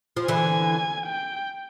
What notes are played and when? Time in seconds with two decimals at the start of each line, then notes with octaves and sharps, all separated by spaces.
0.17 F3
0.28 D3 E3 G#5
1.06 G5